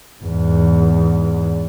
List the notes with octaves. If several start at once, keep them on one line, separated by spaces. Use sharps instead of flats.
E2 G#2